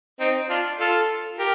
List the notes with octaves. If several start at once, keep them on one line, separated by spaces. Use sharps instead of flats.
C4 D#4
D4 F4
F4 A4
G4 A#4